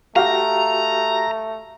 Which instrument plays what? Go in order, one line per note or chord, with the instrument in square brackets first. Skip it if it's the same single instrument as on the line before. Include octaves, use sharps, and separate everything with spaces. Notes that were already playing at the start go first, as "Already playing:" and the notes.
[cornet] A3 [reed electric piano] F#4 G4 G5 [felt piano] F5 [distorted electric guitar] A#5